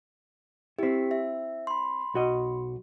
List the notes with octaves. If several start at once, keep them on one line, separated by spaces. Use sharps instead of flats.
C4 E4 G4 B6
E5
B5 C6
B1 F#4 D#5